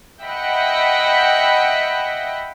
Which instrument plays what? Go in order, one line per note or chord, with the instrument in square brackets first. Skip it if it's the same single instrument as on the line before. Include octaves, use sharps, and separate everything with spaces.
[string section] D#5 E5 F#5 G5 B5